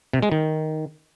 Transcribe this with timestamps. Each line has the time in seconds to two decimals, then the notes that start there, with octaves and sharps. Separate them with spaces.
0.13 C3
0.22 G#3
0.32 D#3